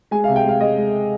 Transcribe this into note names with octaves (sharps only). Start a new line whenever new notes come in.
G#3 G#5
C3 F5
G5
G#3 F5
G#3 D#5
G#3